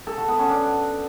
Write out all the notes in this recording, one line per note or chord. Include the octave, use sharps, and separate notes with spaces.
A4
F#4
B3
C#4
D4